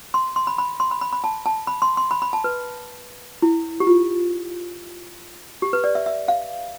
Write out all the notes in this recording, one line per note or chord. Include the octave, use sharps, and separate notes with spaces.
C6
C6
B5
B5
C6
B5
B5
B5
A5
A5
B5
C6
C6
B5
B5
A5
B4
E4
G4
F4
G4
B4
D5
E5
E5
F5